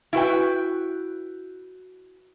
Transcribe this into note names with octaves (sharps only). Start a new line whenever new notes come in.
E4 F#4 B4 G5